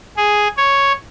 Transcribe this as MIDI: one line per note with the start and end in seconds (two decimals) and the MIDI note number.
0.17 0.48 68
0.57 0.93 73